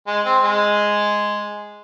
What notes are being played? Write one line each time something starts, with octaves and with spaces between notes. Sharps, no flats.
G#3
C4
G#3